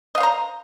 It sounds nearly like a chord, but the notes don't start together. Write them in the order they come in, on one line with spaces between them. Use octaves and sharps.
D#5 F5 C5 A#5